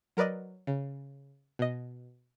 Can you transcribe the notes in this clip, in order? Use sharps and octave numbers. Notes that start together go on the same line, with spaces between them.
F#3 A#4 B4 D5 D#5
C#3
B2 D#5